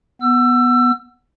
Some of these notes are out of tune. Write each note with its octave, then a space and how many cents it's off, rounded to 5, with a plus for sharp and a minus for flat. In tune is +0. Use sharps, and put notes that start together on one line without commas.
B3 -5 E6 +25